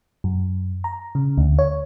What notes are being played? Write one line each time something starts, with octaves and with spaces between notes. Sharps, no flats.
F#2
A#5
C#3
D2
C#5